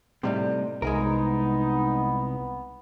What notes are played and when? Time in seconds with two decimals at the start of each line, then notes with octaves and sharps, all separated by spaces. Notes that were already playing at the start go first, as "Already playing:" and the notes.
0.23 A2 C3 G3 D#4
0.82 C2 G#3 B3 D#4 G#4 A#4